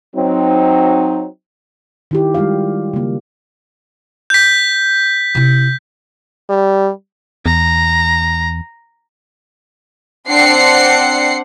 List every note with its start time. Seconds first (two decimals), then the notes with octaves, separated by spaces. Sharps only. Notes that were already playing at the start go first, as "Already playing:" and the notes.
0.16 F#3 C4 D#4
2.11 D#3 E4 G4
2.34 G3 G#3 F4 F5
2.94 C#3 A#3
4.30 G6 B6
5.35 C3 E4
6.50 G3
7.46 E2 A#5
10.29 C4 D4 F#5 C7 C#7